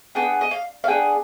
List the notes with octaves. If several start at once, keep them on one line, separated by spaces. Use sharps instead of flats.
B3 D4 G#4 G5
D#5
F5
F5
B3 D4 G#4 G5